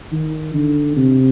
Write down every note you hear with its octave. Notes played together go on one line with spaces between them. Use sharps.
D#3
D3
C3